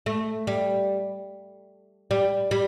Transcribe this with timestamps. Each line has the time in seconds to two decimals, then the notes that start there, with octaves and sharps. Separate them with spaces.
0.06 A3
0.47 G3
2.11 G3
2.51 G3